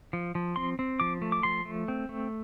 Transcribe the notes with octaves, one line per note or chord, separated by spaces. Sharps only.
F3
F3
C4 C6
C4
F3 D6
A3
D6
F3 C6
A3
C4
A3